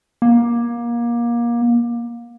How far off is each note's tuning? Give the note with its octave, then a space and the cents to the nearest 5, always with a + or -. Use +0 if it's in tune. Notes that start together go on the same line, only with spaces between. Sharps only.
A#3 +25